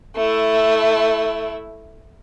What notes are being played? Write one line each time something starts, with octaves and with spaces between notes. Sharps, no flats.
A3 E4